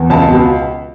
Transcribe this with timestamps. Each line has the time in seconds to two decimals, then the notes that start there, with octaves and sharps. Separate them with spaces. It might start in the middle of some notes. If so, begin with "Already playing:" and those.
Already playing: E2
0.10 C#2 A5
0.28 B2